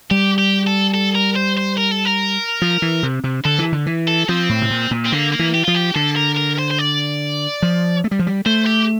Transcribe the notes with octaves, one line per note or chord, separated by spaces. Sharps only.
G3 G4
G4
A4
A4
A#4
C5
C5
A#4
A4
A#4
F3
E3
C3
C3
D3 A4
E3
D3
E3
A4
F3 C4
A2
C3
A#2
A#2
C4
D3 A#3
A#3
E3
G4
F3 F4
G4
D3 A4
A#4
A#4
C5
C5
D5
F3
A3
G3
F3
G3
A3 C5
G4